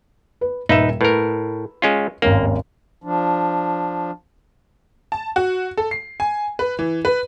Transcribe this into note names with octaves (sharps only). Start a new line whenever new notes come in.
B4
D#1 D#4 B4 E5 E7
A2 A#4 B4
G#3 C#4 F4
G#1 D#2 A#3 C#4
F3 D4
A5
F#4
A4
C7
G#5
B4
E3
B4